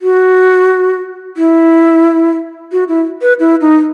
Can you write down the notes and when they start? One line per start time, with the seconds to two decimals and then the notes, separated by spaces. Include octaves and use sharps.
0.02 F#4
1.37 E4
2.72 F#4
2.88 E4
3.22 B4
3.40 E4
3.61 D#4